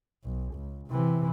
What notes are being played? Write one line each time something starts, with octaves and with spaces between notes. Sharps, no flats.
B1
C#2
C3 E3